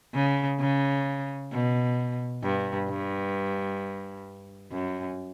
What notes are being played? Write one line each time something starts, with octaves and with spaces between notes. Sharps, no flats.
C#3
C#3
B2
G2
G2
F#2